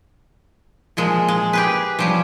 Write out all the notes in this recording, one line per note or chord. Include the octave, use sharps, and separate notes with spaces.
A#2 F3 G#3
G#3
G4 G#4 B4
F3 G3 C#4